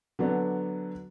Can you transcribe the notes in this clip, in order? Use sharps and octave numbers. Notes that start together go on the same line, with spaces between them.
D3 F#3 B3 D4